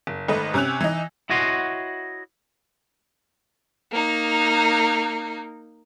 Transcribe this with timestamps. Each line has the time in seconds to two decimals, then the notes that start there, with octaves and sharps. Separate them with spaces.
0.07 F#1
0.28 G#1 A3 B4 D#5
0.54 C3 C#4 G#5 E6 F#6 F7
0.80 E3 D#4
1.30 E4 F#4 C#5 D#5 F#5 C6
3.92 A#3 D#4